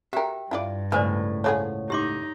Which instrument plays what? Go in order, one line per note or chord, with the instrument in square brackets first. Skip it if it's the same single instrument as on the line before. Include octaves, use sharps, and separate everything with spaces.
[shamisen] F#4 A#4 [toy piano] G4 G5 [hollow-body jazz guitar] E5
[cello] G2 [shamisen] E4 F4 D5
[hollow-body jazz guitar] C#2 A2 [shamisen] B3 G#5 [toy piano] B4 C5 D5
[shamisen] F3 A3 G#4 [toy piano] C#5 F#5
[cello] D#4 [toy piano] G4 C6 D6